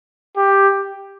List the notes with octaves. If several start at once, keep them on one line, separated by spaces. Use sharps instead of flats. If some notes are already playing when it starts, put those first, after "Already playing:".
G4